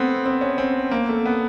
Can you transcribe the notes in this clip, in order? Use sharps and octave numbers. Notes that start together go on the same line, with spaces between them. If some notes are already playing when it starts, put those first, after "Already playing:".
Already playing: A3 B3 C4
C4
C#4
C4
A#3
A3
B3